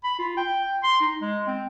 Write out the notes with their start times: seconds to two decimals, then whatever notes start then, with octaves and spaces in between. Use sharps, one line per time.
0.04 B5
0.19 F4
0.37 G5
0.83 C6
1.00 D#4
1.21 G#3
1.47 C4